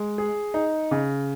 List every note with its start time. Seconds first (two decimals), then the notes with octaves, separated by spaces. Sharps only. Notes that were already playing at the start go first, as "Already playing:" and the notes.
Already playing: G#3
0.18 G#4
0.54 D#4
0.91 C#3